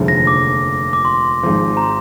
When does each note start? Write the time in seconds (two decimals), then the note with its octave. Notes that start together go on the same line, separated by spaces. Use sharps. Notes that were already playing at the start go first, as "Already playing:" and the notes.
Already playing: F1 D#2 D3 F3 G#3
0.08 A#6
0.27 D6
0.93 D6
1.05 C6
1.43 G#1 G#2 F3
1.77 A#5
1.82 C6